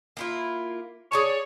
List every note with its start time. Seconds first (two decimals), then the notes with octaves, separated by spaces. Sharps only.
0.17 A#3 E4 F4
1.12 G#4 C#5 D5 A5